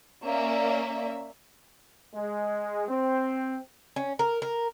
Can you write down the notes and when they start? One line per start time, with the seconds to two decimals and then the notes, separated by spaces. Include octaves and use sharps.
0.25 A#3 C#4 D5 E5
2.14 G#3
2.89 C4
3.96 C#4
4.19 A#4
4.42 A#4